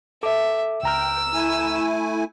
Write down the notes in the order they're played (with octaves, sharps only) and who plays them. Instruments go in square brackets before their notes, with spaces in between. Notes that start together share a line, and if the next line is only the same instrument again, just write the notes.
[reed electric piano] A4 D6 [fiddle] E5
[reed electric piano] C#2 A#5 F6 [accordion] G5 [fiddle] E6
[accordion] A3 E4 G#5